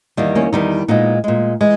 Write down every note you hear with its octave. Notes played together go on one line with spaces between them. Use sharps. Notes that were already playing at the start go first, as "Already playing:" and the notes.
E2 D#3 G3 A#3
A#3 C#4
E2 D#3 G3 B3 D#4
A#2 G#3 B3 D#4
A#2 G#3
E3 G#3